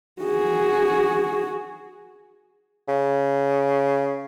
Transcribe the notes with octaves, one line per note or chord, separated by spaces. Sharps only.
F#4 G#4
C#3